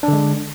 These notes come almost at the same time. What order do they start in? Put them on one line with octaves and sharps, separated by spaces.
D4 D3 G#3